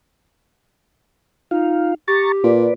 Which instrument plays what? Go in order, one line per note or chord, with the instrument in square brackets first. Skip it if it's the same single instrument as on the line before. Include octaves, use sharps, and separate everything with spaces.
[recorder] D#4 [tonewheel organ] F4 F5
[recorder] G4 [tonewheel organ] A#5 C#6 A6
[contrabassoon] A#2 [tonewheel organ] B4 D5